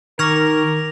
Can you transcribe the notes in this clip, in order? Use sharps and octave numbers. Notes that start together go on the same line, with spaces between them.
D#3 A#4 C#6 D6 F6 G#6 A#6 F7